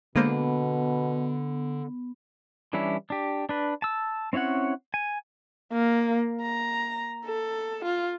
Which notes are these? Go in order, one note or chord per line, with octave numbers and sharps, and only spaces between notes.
B2 D3 G#3 A#3 B3 C5
E3 G3 C#4 D4 E4
D4 G4
D4 B4
A5 E6
C4 C#4 E4 C#5 F#5
G#5
A#3
A#5
A4
F4